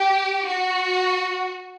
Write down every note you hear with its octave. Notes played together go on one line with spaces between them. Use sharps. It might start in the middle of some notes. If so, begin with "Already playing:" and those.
Already playing: G4
F#4